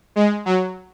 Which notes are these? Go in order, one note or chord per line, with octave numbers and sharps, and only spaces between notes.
G#3
F#3